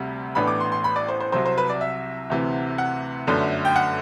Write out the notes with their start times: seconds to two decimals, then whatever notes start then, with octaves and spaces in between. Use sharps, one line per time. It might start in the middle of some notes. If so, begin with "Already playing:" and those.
Already playing: D2 C3 G3
0.35 A1 A2 E3 B3 D4 B5
0.48 D6
0.60 C6
0.72 C6
0.84 B5
0.96 D5
1.09 C5
1.20 C5
1.32 C2 C3 F#3 C5
1.46 C5
1.58 B4
1.70 D5
1.81 E5
2.30 D2 C3 E3
2.78 F#5
3.27 G1 F#2 D3 A3 D4
3.65 G5
3.76 F#5